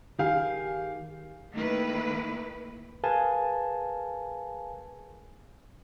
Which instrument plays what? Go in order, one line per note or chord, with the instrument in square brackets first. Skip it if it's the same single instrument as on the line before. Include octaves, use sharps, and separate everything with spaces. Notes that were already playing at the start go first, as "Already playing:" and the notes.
[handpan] D#3 [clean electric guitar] G4 G#4 [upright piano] F5
[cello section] D#3 A3 A#3 E4 B4
[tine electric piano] G#4 A#4 B4 F5 G#5 A5